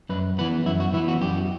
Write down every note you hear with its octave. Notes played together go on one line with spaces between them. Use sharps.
F#2 B4
E3 B3 B4
F#2 E4
F#4
E3 B3 E4
F#4
F#2 G4